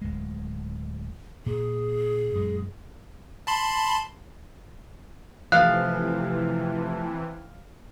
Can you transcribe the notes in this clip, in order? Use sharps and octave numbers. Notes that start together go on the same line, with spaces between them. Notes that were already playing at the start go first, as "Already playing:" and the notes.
D1 G#3
A#2 G#4
F#2 A#2 G#3
A5 B5 C6
C3 E3 F3 A3 F5 F#6